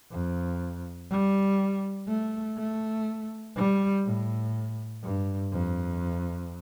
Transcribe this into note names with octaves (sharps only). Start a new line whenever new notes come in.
F2
G3
A3
A3
G3
A2
G2
F2